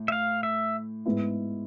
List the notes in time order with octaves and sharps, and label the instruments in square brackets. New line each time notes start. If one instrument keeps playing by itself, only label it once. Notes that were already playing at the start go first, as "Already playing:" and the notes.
Already playing: [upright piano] A2
[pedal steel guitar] E5
F5
E5
[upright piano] G#2 G#3 B3 E4